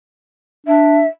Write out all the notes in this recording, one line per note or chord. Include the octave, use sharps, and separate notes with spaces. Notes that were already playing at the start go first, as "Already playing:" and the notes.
D4 E5